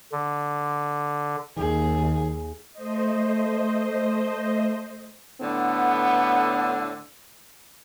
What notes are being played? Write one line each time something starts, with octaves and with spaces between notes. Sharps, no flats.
D3
D#2 D#3 G#4
A3 C5 D#5
A2 D3 B3